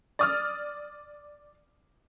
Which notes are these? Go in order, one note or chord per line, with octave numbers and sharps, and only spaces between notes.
D5 D#6 F6